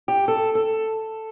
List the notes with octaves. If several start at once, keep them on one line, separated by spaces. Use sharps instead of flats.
G4
A4
A4